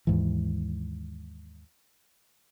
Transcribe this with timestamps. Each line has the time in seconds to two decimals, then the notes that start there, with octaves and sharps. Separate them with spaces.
0.07 D#2 G#2 E3